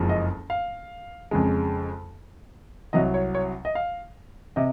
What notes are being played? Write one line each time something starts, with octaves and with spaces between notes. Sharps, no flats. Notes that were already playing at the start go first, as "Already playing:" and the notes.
Already playing: F#1 F2 F3 G#3
D#5
F5
F2 C#3 G#3
C2 C3 F#3 D#5
C#5
C#5
D#5
F5
C3 D#5